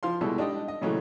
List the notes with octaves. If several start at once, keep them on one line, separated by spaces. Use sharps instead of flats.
F3 F5 C6
B2 G3 G#3 E4 A4
D4 D#4 G4 D#5
D#5
A#2 C#3 E3 F#3 A3